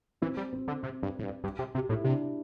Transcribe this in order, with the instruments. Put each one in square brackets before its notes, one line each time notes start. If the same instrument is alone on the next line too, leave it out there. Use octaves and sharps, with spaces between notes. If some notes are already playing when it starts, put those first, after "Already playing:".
[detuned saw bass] E3 [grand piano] C4
[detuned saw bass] G3
[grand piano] C4
[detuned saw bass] D3
C3
G2
A2
G2
G2
C3
C3
[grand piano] G4
[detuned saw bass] A2 [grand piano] E4
[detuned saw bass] C3 [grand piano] D4